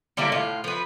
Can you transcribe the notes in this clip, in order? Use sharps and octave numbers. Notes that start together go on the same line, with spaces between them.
D3 G3 A#3 E4
A2 F4
F3 B4